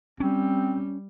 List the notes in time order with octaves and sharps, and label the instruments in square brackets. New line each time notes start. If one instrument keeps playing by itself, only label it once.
[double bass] G3 [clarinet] C4 [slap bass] C#4